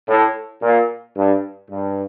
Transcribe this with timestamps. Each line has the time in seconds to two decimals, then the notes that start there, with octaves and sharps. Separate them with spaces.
0.08 A2
0.63 A#2
1.17 G2
1.71 G2